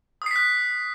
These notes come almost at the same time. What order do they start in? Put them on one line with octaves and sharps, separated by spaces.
D#6 C7 B6 F#6